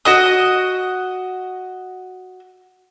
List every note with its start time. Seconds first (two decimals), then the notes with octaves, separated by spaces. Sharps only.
0.05 F#4 D#5 D#6